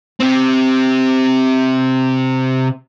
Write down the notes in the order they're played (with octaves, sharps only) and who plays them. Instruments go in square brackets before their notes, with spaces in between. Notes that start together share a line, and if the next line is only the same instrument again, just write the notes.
[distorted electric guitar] C3 C4